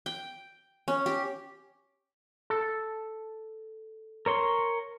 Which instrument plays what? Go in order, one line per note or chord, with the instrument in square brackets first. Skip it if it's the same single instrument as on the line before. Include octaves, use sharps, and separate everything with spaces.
[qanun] G5
C#4
G4
[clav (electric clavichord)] A4
[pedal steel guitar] A#4 C#5 C6